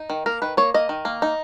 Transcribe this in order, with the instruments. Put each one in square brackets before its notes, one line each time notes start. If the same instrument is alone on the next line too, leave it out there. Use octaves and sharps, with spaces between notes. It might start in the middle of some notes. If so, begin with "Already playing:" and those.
Already playing: [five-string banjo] D#4
D#3
A#3 A#4
D#3 B4
A#3 C#5
A#3 D#5
D#3
A#3
D#4